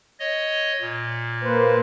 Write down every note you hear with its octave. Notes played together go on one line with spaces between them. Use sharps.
C#5 D#5
A#2
A#3 B4 C5